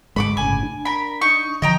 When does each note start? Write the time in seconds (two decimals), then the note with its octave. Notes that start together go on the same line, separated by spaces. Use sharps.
0.16 D2 G#2 G#3 B5 C#6 D6
0.37 G1 A2 C#3 G#5
0.63 D4
0.85 A#4 B5
1.22 D#4 C#6
1.62 D3 F3 D#5 G5 A#5